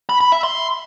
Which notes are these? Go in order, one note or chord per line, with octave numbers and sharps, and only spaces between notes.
B5
B5
E5
C6